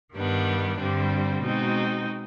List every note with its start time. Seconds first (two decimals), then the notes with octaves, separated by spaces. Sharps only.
0.15 G2 D#3 G3 B3 D4
0.79 G2 D3 G3 C4
1.43 B2 G#3 C4 D#4 F#4